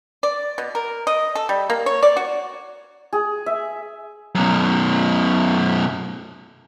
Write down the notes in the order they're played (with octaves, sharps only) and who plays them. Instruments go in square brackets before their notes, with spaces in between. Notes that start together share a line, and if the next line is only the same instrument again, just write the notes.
[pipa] D5
B2
A#4
D#5
A4
G3
A#3
C#5
D5
F#4
[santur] G#4
E5
[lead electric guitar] F#2 B2